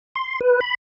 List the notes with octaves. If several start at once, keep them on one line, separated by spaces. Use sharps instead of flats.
C6
B4
B5